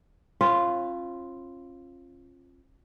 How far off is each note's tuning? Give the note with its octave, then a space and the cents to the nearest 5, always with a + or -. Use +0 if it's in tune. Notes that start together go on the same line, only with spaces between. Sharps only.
C#4 -45 F4 -5 B4 +0